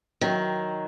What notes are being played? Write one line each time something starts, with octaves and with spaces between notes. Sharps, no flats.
D#3 F#3